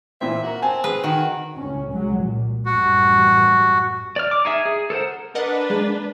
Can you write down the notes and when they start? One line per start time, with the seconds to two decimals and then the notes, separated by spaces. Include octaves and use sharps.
0.21 A#2 E3 C4 E5
0.43 F#4 A#4 A#5
0.62 C4 G#5 A5
0.84 G#4 B4
1.04 D#3 F#4
1.58 C#2 A2 C#4
1.92 C2 F#3 G#3
2.23 A#2
2.65 A1 F#2 G3 F#4
4.16 D5 F6
4.31 D6
4.45 D#4 G#4 E5
4.65 G#4
4.90 A4 A#4 C5 F#5
5.35 D4 A#4 B4 D#5 F#5
5.70 G#3 A#3